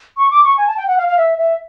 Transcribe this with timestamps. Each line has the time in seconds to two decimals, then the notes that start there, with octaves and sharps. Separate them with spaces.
0.17 C#6
0.31 D6
0.44 C#6
0.57 G#5
0.67 A5
0.77 G5
0.88 F#5
0.98 F5
1.08 F5
1.17 E5
1.38 E5